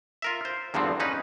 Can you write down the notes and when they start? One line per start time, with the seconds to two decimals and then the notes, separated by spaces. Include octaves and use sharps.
0.22 F4 A#4 E5
0.45 C5
0.74 E2 G2 D3 F3 C4
1.00 C#4 D#4 B4